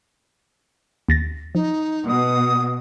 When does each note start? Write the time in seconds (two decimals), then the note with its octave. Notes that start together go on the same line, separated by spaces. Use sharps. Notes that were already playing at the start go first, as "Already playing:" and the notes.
1.08 D#2 A6 A#6
1.55 F3 D#4
2.08 B2 D#6